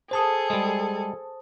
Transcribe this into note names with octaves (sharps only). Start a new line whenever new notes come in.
G#4 A4 C5 A5 D#6
G3 G#3